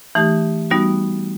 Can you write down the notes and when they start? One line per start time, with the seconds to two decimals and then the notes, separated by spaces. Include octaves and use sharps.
0.15 E3 A3 D#4 G4
0.70 G3 B3 D#4 F#4